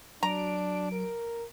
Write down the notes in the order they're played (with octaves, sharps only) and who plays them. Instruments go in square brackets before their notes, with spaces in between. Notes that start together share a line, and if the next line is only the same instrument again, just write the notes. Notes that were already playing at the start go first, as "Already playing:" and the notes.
[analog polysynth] F#3 D7 [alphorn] D4 [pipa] A#5
[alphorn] A#4